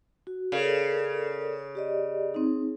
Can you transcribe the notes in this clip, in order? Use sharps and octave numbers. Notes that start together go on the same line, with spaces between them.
F#4
C#3 A4 A#4 D5
G4 D5 D#5
C4 D#4